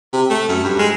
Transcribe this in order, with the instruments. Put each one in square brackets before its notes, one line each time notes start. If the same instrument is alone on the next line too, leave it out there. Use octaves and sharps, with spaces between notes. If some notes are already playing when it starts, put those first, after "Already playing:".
[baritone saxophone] C3
A3
F#2
G2
G#3